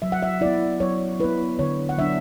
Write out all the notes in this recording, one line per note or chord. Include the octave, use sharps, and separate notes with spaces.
F#3 E5
F#5
E5
B3 E4 D5
F#3 C#5
B3 E4 B4
D3 C#5
F#5
F#3 B3 D4 E5